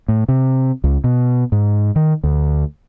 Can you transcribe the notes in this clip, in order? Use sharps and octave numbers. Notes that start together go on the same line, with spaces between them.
A2
C3
C#2
B2
G#2
D#3
D2